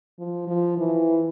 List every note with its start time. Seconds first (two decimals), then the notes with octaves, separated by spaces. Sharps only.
0.19 F3
0.48 F3
0.78 E3